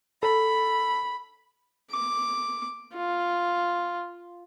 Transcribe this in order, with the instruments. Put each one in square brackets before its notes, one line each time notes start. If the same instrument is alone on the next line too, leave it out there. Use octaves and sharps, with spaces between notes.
[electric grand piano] A4 [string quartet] B5
[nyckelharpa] D6
F4